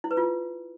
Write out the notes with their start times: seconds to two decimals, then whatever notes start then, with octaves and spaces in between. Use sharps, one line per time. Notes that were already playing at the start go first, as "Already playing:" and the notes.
0.04 E4
0.11 B4
0.17 F4